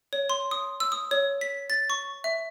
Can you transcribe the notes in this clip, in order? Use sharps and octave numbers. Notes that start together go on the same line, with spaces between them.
C#5
C6
D#6
E6
D#6
C#5
B6
A6
C#6
E5